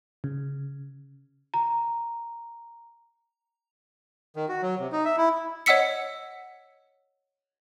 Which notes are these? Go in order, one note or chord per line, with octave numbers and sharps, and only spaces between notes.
C#3
A#5
D#3
F#4
F#3
C3
D#4
E5
E4
C#5 D#5 F#5 E6 B6 C#7